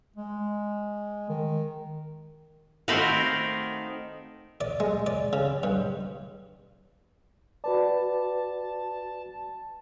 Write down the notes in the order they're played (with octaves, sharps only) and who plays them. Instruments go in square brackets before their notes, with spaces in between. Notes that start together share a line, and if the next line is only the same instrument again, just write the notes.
[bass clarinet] G#3
D#3
[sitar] D#3 [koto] A3 C4 F#4 [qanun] F5 B5 C6
[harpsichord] D5
G#3
D5
C#3
G2
[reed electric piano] F#4 B4 D5 [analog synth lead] A5